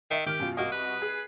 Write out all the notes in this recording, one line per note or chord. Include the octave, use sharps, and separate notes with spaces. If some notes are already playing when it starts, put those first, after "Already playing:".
D#3 E5 B6
D#3 G4 F6
F#2 B2 F4
C2 A#3 F#4 D#5
B4
G#4